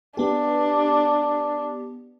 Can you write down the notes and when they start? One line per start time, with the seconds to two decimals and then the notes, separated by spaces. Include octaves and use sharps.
0.17 B3 D4 G4